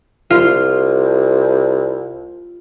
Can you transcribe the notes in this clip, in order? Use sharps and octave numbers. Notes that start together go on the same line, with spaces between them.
C2 F4